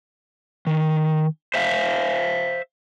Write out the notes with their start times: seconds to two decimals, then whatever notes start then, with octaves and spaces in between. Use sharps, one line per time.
0.67 D#3
1.54 C5 E5 F5